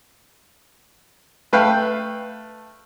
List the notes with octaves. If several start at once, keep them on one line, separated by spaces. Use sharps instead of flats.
A3 B4 F5 G5